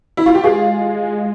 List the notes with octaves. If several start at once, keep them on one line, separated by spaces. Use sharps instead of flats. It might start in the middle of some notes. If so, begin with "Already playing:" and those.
E4
F4
G4
G#3 F4 G#4